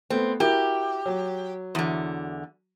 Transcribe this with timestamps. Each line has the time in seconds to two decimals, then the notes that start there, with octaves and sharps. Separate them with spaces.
0.10 A3 B3 C4
0.40 E4 F#4 G4 A#4
1.06 F#3
1.75 E2 D3